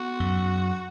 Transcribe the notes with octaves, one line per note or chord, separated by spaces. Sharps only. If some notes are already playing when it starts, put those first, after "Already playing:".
Already playing: B3 F#4
F#2